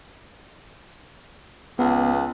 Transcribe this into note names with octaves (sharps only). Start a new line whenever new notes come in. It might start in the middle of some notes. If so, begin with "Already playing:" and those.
C#2 B3